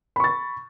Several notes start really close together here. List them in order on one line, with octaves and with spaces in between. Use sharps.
B5 C#6 A6